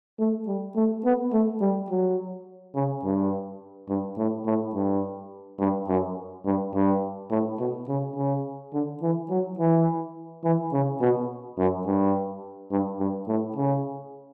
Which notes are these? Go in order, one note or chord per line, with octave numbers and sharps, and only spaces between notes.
A3
G3
A3
B3
A3
G3
F#3
C#3
G2
G2
A2
A2
G2
G2
F#2
G2
G2
A2
B2
C#3
C#3
D3
E3
F#3
E3
E3
C#3
B2
F#2
G2
G2
G2
A2
C#3